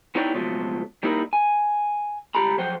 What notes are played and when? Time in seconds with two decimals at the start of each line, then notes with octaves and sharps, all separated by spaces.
0.15 B3 D#4 E4 C#5 D5 G5
0.34 C#2 B2 F3 F#3 A3
1.03 G3 A#3 D#4 E4 G4 A#4
1.33 G#5
2.35 C#2 G3 G4 A4 A#5 B5
2.58 F3 F#3 C5 F#5 G5